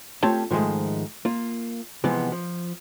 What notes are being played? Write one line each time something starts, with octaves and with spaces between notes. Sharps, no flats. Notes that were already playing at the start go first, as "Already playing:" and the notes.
A3 C4 F4 G4 C#5 A5
G#2 D#3 F3 F#3 G#3 A3
A#3 F4
C3 E3 F3 G#3 B3
F3